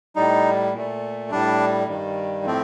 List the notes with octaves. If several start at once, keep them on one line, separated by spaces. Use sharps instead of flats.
A2 G3 D#4
A#2 A3
A2 G3 D4
G2 D#3 G3
A2 F3 A3 C4